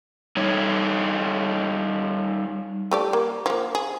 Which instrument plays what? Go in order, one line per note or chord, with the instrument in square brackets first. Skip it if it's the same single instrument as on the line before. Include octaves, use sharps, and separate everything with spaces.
[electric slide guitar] G3 D#4 C#5
[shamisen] A3 G4 D5
A#3
F3 A#3
G#4